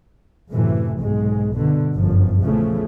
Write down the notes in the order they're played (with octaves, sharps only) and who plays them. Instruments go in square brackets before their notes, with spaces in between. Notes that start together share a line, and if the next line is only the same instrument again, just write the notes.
[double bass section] F#2 A2 C3 E3
B1 G#2 G#3
G1 B2 D3
G1 F#2 F3
A#1 E2 C#3 E3 F3 A3